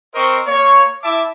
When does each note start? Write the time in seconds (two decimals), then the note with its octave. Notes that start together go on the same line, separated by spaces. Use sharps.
0.15 C4 A#4 C5 D#5 C#6
0.47 A#3 C#5
1.03 E4 E5 A5 D6